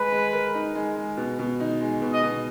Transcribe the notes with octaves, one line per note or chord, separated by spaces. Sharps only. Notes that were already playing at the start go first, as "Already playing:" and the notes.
Already playing: G#3 B4
G#3
A#4
D#4
G#3
G#3
B2
B2
D#4
G#3
B2
D#5
B2